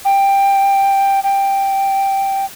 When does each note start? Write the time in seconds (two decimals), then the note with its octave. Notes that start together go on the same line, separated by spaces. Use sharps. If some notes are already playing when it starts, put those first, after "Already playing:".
0.05 G5
1.24 G5